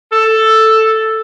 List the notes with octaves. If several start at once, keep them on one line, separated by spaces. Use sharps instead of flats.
A4